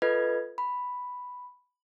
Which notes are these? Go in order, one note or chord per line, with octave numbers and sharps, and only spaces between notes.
F4 A4 B4 D#5 G#6
B5